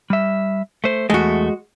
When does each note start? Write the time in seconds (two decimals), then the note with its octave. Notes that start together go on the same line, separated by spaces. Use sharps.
0.10 G3 E5
0.84 A3 C5
1.10 E2 G#3 A3 F#4